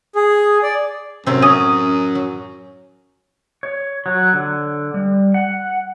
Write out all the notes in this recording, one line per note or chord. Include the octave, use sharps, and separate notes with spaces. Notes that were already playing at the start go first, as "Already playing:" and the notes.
G#4
D5
F#2 A2 C3 C4
C#4 D#6 D#7
F#3
C#5
F#3
D3
G3
F#5